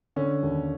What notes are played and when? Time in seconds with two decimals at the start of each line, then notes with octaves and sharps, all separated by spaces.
0.16 D3 C#4
0.43 D#2